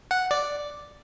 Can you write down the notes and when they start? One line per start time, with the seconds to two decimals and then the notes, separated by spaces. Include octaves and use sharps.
0.11 F#5
0.31 D5